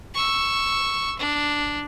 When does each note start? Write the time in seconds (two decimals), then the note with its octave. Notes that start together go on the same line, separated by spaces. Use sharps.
0.15 C#6 E6
1.19 D4